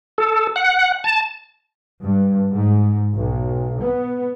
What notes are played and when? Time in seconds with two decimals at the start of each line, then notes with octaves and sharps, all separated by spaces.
0.18 A4
0.56 F#5
1.04 A5
2.03 G2
2.55 G#2
3.14 B1
3.82 B3